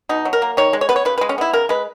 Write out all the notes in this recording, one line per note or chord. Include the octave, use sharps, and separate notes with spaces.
B2 D#4
F#3
A#4
A#3
D#3 C#5
G#3
C#5
B3 B4
C#5
C#3 B4
B4
G#3
C#4
B3 E4
C#3 A#4
G#3 B4